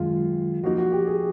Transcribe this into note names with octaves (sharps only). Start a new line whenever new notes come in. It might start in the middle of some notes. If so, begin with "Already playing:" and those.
Already playing: F#2 D#3 G#3 F4
F3 A#3 D#4 F#4
F#4
G4
G#4